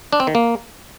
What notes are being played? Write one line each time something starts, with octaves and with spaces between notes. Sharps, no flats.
D4
C4
D#3
A#3